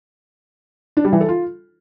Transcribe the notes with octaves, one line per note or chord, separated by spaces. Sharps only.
D4
G3
E3
A4
F4